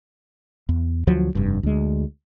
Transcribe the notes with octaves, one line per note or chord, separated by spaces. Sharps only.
E2
D2 F3 F#3
F1 G2
D2 G#3